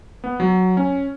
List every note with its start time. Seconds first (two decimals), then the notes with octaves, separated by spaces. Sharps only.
0.24 B3
0.40 F#3
0.77 C#4